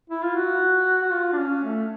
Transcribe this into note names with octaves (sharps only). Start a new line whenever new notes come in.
E4
F4
F#4
F#4
F4
D4
C#4
A3